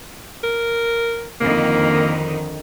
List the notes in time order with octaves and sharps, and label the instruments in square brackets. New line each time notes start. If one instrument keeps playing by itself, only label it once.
[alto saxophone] A#4
[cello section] F2 D3 D#3 [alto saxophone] A#3